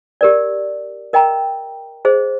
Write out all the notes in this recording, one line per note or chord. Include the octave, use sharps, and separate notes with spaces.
G4 A#4 D5
A#4 D#5 G5 A#5
G#4 C5 D#5